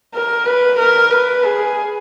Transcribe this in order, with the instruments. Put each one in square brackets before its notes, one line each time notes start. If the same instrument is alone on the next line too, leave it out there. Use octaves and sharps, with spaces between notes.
[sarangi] A#4
B4
A#4
B4
G#4